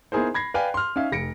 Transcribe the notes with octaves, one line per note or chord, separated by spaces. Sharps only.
B3 D#4 E4 G#4 A#4 C5
B5 G#6 A#6 C7
B4 D5 F5 G5 G#5
C6 F6
C#4 D#4 E5 F5
F1 A#6 C#7 D7